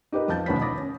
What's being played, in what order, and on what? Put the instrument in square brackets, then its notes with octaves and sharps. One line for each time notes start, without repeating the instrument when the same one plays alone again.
[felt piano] D#4 G4 A#4 B4 D#5
F2 F3 A5 G6 A6
D#2 B2 C#4 B5 B6
B5 D6 D#6 A6 A#6
C#4